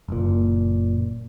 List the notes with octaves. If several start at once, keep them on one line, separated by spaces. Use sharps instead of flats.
F#1 A#2